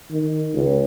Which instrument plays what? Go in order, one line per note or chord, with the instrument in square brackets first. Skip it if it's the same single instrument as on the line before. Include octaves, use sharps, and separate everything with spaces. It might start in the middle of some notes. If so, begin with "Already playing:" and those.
[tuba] D#3
C#2